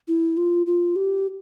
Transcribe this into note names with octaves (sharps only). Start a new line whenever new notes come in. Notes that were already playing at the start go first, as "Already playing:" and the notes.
E4
F4
F4
G4